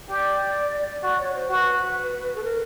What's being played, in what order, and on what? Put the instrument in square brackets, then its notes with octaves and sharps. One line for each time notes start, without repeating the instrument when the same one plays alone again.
[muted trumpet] G4 [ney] D5
[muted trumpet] F#4 [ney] D5
[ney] C#5
C5
[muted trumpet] F#4 [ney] B4 C5
[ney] A4
A#4